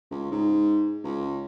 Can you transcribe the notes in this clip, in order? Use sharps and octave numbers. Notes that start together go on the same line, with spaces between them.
C#2
G#2
C#2